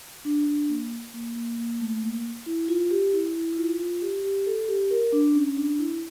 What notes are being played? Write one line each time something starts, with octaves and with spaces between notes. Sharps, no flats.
D4
D4
A#3
A#3
A#3
A#3
A3
A#3
E4
F4
G4
E4
E4
E4
F4
F4
G4
G4
A4
G4
A#4
D4
C#4
D4
E4